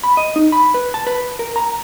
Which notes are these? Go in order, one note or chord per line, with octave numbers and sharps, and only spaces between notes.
B5
D#5
D#4
B5
B4
A5
B4
A#4
A#5